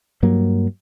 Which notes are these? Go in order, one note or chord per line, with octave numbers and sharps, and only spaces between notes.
G2 F#3 A#3